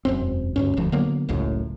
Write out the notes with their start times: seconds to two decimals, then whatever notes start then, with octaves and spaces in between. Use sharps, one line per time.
0.05 E1 F#2 C4
0.56 D2 G2 C#4
0.77 D#1 D2 F3
0.92 D3 F#3 A#3 B3
1.29 F#1 C#2 F#2 A2